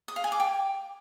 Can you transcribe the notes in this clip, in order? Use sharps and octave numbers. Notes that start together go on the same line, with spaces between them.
D#6
F5
G#5
D6
G5